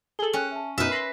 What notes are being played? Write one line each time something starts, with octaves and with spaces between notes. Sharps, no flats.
G#4 A4 F#7 G7
C#4 G5 F#6
E5 A5
F#2 B2 D#4 B4 E5 F6 D#7
B5 C6 A#6 C7